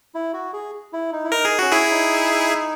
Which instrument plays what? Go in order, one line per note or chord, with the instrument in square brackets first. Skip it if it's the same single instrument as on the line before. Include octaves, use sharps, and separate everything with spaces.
[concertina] E4
F#4
G#4
E4
D#4
E4
[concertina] D#4 [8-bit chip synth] A#4
[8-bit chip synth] G#4
[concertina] C#4 [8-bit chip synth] F#4
[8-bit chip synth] E4 G#4
[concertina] D#4